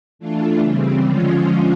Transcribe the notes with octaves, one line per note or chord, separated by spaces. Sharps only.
E3 A3 D4 F4
C#3 E3 G3 C4
D3 F3 G#3 C#4 F4